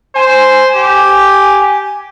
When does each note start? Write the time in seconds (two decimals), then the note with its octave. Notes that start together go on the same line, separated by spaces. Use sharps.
0.15 C5 G#5
0.76 G4